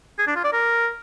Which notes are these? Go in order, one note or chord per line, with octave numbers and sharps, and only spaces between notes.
G#4
D4
F4
D5
A#4